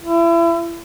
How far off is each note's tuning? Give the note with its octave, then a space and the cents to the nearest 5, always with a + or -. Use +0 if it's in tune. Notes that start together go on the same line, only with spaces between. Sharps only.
E4 +35